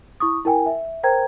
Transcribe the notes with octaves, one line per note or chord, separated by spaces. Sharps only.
E4 C#6 D#6
E4 A#4 G5 G#5
E5
A#4 C5 G5 A#5 G#6